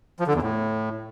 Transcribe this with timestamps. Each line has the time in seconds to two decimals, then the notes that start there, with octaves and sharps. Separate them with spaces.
0.20 F3
0.27 D3
0.35 E2
0.42 A2